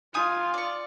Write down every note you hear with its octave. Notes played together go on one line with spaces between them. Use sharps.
D#4 F4 G#5 D#6
D5 C#6